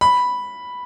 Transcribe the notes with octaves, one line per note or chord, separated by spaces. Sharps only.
B5